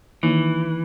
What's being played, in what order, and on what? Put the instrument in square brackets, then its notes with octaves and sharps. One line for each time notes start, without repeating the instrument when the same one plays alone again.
[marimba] D#3 A#3 D#4 [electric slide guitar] E3